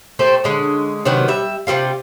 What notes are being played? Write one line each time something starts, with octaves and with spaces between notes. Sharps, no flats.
A3 G4 A4 C5
D3 G#3 C#4
C3 D#3 F#3 B3
G3 E5
C3 E3 G3 F4